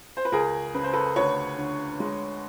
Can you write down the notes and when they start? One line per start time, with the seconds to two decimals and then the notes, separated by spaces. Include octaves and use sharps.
0.17 C5
0.25 B4
0.32 C#2 G#4 A#4
0.74 C#3 B4
0.84 C5
0.93 A4 B4
1.16 D2 B4 C#5
1.58 D3
2.00 G#3